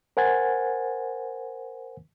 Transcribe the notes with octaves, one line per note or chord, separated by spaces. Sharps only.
A#4 C5 F#5 G#5 G#6 A6